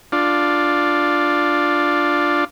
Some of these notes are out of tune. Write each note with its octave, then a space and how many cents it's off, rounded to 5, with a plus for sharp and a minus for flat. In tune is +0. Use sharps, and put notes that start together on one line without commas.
D4 +0 F4 +5